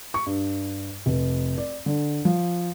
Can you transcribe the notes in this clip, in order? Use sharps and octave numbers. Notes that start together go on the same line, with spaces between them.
C#6
G2
F1
D5
D3
F3